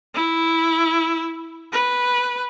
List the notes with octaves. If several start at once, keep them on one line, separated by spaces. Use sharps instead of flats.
E4
B4